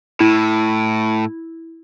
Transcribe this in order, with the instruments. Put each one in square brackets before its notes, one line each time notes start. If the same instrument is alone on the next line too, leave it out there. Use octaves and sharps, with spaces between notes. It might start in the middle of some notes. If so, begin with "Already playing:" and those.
[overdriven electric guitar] A2 [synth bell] E4